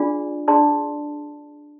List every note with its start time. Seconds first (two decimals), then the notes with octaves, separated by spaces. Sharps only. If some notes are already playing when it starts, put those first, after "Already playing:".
Already playing: D4 F4 G#4 D5 G#5
0.48 D4 G#4 D5 A5 C6